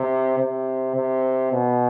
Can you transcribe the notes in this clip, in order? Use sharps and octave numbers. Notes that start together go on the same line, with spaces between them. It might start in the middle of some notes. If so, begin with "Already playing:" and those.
Already playing: C3
C3
C3
B2